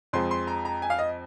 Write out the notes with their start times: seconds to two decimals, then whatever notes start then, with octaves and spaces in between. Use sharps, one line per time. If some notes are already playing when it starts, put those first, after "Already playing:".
0.13 F2 F3 G#3 C6
0.31 C6
0.47 A#5
0.65 A#5
0.82 G#5
0.90 F5
0.99 D#5